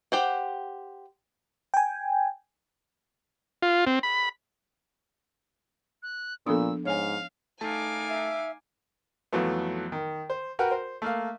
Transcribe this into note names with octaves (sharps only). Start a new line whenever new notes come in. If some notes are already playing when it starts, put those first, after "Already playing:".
G4 C5 F#5
G5 G#5
F4
C4
B5
F#6
A#2 F3 B3 D4 A4 D#6 E6
G#2 C#5 F5 G#5
A3 D#4 F5 G#5 A5 D6
E5
F2 E3 F#3 A3 B3
D#3
C5
F#4 A#4 B4 F#5 G5
C5
A3 A#3 F5